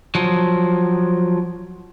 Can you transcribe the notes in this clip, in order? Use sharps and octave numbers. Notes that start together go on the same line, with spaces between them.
F3 F#3